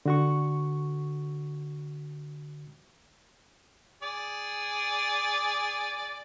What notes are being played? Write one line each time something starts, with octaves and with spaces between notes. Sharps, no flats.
D3 F#4 C#6
G#4 D5